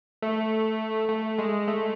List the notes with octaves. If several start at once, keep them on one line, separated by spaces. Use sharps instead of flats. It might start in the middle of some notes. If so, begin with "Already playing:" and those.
A3
A3
G#3
A3